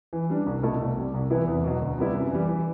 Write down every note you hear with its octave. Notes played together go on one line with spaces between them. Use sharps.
E3
G3 D4
C2
B2 A3 E4 A4
C2
C3 G3
C2
C3 E3 B3 E4
E2
B2 F#3
D2
C3 G3 B3 E4
F#2
E3 G3
E3